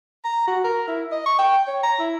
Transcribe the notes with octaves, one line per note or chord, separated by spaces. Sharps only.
A#5
F#4
A#4
E4
D#5
C#6
G5
C#5
A#5
E4